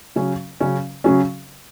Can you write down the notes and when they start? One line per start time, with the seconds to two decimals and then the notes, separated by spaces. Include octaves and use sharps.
0.16 C#3 F#3 C#4
0.60 C#3 F#3 C#4
1.04 C#3 F#3 C#4